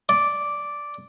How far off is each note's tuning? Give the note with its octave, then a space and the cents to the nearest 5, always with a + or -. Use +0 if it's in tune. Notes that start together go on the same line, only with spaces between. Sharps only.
D5 -5